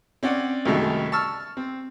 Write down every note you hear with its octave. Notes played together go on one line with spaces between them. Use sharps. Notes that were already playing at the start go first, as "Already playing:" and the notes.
C4 C#4 D5 F#5
C2 F#2 D#3 F#3 G#3 A3
A5 C#6 E6 F6
C4